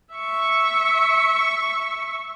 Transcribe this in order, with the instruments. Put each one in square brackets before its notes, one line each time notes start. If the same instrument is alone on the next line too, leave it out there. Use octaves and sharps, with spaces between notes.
[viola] E5 C#6